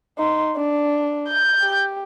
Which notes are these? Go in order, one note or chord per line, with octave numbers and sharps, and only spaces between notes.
D#4 C6
D4
G6
G4